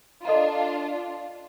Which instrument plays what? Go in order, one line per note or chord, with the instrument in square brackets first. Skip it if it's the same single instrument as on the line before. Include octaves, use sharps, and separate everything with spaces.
[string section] D4 F4 [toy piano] A4 D#5 A#5